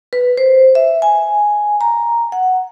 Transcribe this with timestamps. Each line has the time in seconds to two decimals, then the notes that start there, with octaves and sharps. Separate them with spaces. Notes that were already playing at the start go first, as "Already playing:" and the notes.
0.13 B4
0.38 C5
0.75 E5
1.02 G#5
1.81 A#5
2.32 F#5